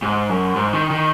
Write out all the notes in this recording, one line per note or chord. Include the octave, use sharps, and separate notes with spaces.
G#2
F#2
G#2
D#3
D#3